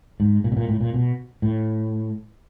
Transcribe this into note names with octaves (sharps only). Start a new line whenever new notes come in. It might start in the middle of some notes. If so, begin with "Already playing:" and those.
G#2
A#2
B2
A#2
A2
A#2
B2
A2